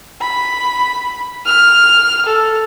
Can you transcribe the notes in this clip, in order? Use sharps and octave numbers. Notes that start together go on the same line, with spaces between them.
B5
F6
A4